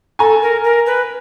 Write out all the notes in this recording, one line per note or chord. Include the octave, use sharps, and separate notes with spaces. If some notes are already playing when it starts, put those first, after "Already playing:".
A4 G#5 A#5
A#4
A#4
B4